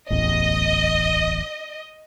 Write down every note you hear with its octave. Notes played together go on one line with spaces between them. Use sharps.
D1 A1 E2 D#5